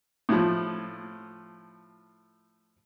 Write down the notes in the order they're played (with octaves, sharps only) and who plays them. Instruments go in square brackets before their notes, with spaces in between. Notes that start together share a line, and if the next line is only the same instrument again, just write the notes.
[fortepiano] A2 F3